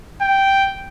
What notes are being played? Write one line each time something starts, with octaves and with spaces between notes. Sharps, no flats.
G5